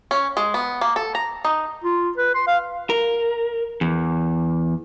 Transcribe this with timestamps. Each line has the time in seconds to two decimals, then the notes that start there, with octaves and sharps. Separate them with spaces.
0.11 C#4
0.37 G#3
0.54 B3
0.81 A#3
0.96 A4
1.15 A#5
1.45 D#4
1.84 F4
2.17 B4
2.34 C6
2.47 F5
2.90 A#4
3.81 E2